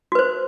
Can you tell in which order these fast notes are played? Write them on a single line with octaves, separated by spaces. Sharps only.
F#4 B4 C5